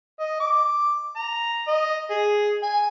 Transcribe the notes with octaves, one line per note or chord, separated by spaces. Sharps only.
D#5
D6
A#5
D#5
G#4
G#5